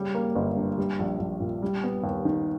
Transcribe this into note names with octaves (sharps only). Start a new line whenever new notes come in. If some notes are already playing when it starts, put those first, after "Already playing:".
Already playing: C#3 G3
A#3
G1
G2
G3
A#1
A#1
A#2
G3
B3
D#2
D#3